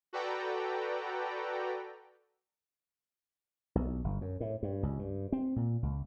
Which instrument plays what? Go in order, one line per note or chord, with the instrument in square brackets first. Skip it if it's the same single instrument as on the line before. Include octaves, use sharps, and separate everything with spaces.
[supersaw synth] F#4 A4 B4 D5 G5 A#5
[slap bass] B1
G1
F#2
A2
G2
C#2
G2
C4
A#2
C#2